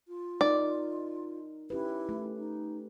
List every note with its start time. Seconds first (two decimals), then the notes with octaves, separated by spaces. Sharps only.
0.08 F4
0.41 D#4 A#4 D5
1.70 C#4 E4 G4 B4
2.09 A3
2.37 D#4